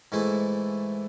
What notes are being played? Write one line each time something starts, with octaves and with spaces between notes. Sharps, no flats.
G#2 E3 A3 E4